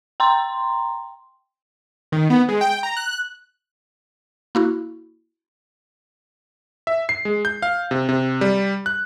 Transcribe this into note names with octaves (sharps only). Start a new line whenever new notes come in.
G5 A#5 C6
D#3
B3
G#3
G5
A#5
F#6
A#3 E4 F#4
E5
C7
G#3
G6
F5
C3
C3
G3
F#6